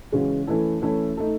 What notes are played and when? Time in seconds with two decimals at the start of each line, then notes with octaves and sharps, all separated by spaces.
0.12 C#3 E3 G#3 C#4 F#4
0.47 E3 A3 C#4 E4 A4
0.82 E3 A3 C#4 E4 A4
1.17 A3 D#4 A4